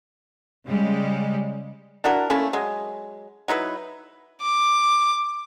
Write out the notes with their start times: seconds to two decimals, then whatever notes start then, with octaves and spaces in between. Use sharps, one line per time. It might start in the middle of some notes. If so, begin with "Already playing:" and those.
0.68 C#3 G3 G#3
2.04 D4 E4 F#4 A#4
2.30 A3 A#3 C#4 E4
2.53 F#3 G#3
3.48 F#3 D#4 E4 B4
4.42 D6